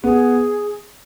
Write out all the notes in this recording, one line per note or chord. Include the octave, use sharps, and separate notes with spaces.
B3 G#4